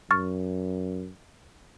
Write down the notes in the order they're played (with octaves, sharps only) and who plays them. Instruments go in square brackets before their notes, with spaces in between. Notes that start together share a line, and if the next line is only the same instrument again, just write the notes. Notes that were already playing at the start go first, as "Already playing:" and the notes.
[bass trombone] F#2 [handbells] C#6 F6 A6